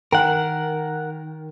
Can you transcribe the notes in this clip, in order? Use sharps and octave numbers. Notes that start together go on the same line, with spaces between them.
D#3 A#4 F#5 G5